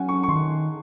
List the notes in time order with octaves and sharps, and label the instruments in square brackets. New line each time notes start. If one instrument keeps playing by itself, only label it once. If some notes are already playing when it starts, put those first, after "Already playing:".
Already playing: [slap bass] F#3 C#4 [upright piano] F#5 G#5
[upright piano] C#6
C#6
[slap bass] D#3 [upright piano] C6